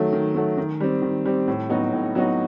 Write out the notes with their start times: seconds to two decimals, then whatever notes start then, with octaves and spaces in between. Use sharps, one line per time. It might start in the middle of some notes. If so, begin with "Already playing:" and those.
Already playing: D#3 F#3 A3
0.13 D#3
0.35 F#3 A3
0.58 D#3
0.80 G3 C4
1.02 D#3
1.26 G3 C4
1.48 A2
1.69 F#3 B3 D#4 F#4
1.93 A2
2.15 F#3 B3 D#4 F#4